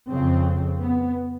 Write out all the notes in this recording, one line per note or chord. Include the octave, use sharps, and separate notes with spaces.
F2 C#3 C4
B3